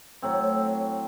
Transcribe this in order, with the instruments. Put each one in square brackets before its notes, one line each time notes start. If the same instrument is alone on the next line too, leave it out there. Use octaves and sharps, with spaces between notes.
[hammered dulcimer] A2 F#3 C4